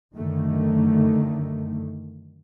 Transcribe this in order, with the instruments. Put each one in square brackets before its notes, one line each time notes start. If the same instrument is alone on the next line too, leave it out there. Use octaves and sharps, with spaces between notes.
[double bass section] F#2 D3 D#3 A3